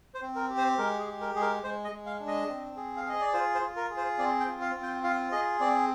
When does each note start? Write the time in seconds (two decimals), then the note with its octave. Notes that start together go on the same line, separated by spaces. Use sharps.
0.14 C5
0.21 C4
0.35 A#4
0.50 G4
0.57 C5
0.78 G#3 A#4
0.99 G#4
1.07 G4
1.21 A#4
1.35 G#3 G#4
1.42 A#4
1.63 G#3 C5
1.84 D#5
1.91 G#3
2.06 F5
2.20 D4
2.27 D#5
2.49 C4
2.77 G#4
2.97 F5
3.04 G#4 D#5
3.21 D5
3.33 F4 C5
3.55 C5
3.62 F4
3.76 A#4
3.90 G#4
3.97 C5
4.18 C4 D5
4.40 G5
4.47 F4
4.61 F5
4.75 C4
4.82 G5
5.03 F4 F5
5.32 G#4 D#5
5.60 C4 D5